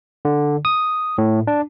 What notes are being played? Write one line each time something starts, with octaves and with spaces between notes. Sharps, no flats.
D3
D#6
A2
D4